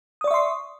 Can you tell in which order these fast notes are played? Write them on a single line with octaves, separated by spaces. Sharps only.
D#6 D5 C#6 E5 C6